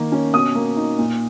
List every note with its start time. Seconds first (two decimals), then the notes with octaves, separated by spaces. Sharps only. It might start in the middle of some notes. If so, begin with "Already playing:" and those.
Already playing: D#3 A#3
0.12 C#4
0.34 B2 D#6
0.55 A#3
0.77 D#4
0.98 A#2